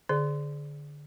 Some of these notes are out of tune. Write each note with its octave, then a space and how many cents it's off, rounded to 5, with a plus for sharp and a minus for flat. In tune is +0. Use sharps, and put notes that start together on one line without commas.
D3 +0 G#4 +15 D5 +0